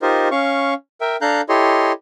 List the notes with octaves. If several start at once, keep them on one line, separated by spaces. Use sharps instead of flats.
D#4 F4 G4 A#4 C5 D#5
C#4 F5 C#6
A#4 E5 G5
D4 A4 F5 A#5 F#6 G6
E4 G4 A4 C#5 D#5 C6